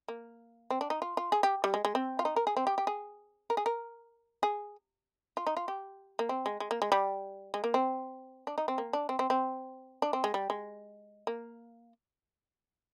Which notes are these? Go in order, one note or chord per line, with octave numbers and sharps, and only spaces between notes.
A#3
C4
D4
D#4
F4
F4
G#4
G4
G3
G#3
G#3
C4
F4
D#4
A#4
G#4
C4
G4
G4
G#4
A#4
G#4
A#4
G#4
F4
D#4
F4
G4
A#3
C4
G#3
G#3
A#3
G#3
G3
G#3
A#3
C4
D4
D#4
C4
A#3
D4
C4
C4
C4
D4
C4
G#3
G3
G#3
A#3